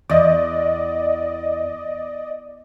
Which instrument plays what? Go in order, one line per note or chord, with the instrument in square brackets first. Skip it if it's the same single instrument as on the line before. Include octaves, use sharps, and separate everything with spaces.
[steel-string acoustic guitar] E2 [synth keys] D5 D#5